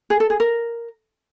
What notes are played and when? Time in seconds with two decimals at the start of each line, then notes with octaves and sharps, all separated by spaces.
0.10 G#4
0.20 A4
0.30 G#4
0.40 A#4